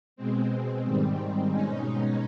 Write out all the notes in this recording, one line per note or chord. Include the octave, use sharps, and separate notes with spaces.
B2 G#3 C4
G#2 D#3 G3 C4
B2 G#3 C#4 D#4